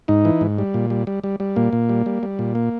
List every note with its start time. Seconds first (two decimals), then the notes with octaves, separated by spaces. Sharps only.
0.08 G#2 D#4
0.25 E3
0.41 G#2
0.58 G3
0.74 A#2
0.90 G3
1.07 G3
1.24 G3
1.40 G3
1.56 A#2 A#3
1.73 A#2
1.89 G3
2.06 G3
2.23 G3
2.39 A#2
2.55 A#3